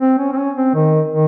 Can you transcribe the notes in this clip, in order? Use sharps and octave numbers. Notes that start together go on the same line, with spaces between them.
C4
C#4
C4
C#4
C4
D#3
D#3